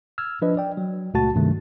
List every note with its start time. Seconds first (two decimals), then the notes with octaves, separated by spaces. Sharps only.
0.18 E6 F6 G#6
0.42 F3 D4 B4 D#5
0.57 D5 G5
0.77 F#3
1.14 C#2 A#2 A3 F#4 A5 A6
1.35 G2 C3 D#3 F#3 A3